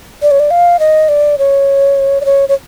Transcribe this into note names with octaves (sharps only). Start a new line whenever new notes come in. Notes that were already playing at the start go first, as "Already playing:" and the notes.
D5
C#5
D5
F5
D#5
D5
C#5
D5
C#5
C#5